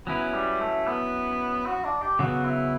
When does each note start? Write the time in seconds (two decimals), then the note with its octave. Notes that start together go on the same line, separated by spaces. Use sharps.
0.07 F#3 B3 C#4 E4 B4
0.33 G3
0.60 A3
0.87 B3
1.66 F#4
1.84 D4
2.02 G4
2.19 C#3 F#3 B3 F#4
2.45 E4